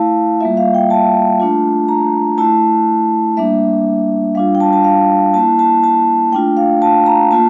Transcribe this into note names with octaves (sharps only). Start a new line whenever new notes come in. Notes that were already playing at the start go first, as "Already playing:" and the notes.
Already playing: A3 E4 F5 A5
G3 A#3 F4 E5
F5
G5
A5
A3 D4 F4
A#5
A3 E4 A5
G3 A#3 D4 E5
G3 D4 F4 F5
G5
A5
A5
F5
A#3 E4 A5
A5
A5
A3 D4 F4 G5
F5
A5
A#5
A#3 F4 A5